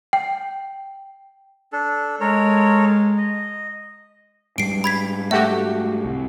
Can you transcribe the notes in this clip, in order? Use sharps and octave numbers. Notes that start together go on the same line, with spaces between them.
G5
D4 A4
G#3 A4 A#4 C#5
D#5
G#2 G3 C7 D7
B5 G#6 B6
A3 F#4 G4 E5
C2